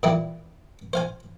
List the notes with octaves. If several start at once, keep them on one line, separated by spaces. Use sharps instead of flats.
A#2 E3 G3 E4
C5 F5 G#5